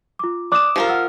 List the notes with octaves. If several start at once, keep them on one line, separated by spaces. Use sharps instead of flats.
F4 D6
D5 D6 D#6 F#6 E7
F3 F4 G4 A#4 F5
F#5 E6 F6